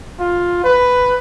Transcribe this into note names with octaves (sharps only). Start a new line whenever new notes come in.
F4
B4